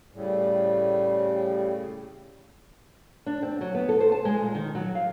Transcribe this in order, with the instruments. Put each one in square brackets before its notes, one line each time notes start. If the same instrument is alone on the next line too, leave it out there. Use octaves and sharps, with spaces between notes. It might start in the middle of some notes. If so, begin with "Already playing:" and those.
[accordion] A2 C#3 [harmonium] G3
[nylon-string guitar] D4
C4
F#3
B3
A4
C5
A5
G#3
A#2
D#3
F#3
F5